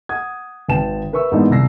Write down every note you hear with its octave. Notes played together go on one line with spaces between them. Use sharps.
F#5 D#6 G#6
G#1 B4 G5 A5 E7
A#4 B4 E5 C#6 E6
G#2 E3 A#3 B3 D4 D#4
D#1 C2 E6 A#6 C7